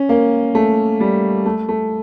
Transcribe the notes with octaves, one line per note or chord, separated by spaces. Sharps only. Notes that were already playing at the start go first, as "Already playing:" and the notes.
Already playing: C#4
A#3
A3
G3
A3
A3